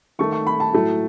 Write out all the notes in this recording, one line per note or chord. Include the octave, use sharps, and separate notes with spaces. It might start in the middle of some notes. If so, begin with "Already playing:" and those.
D#3 A3 C#6
C#6
B5
A5
A2 F#3 A3